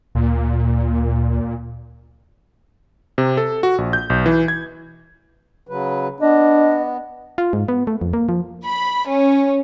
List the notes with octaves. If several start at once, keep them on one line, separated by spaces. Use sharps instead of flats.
D2 A#2
C3
A4
F#4
A#1
G6
B1
E3
G#6
C#3 F#3 B4
B3 D4 D#5
F4
G#2
B3
A3
F2
A#3
F3
B5
C#4